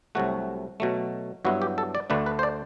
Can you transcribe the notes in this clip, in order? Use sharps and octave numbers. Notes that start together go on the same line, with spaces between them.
C2 C3 F#3 A3 F#4
B2 F#3 A3
G2 F#3 B3 E4 F#4
G4
A4
D5
D2 D3 A3 D4 B4
B4
C5
D5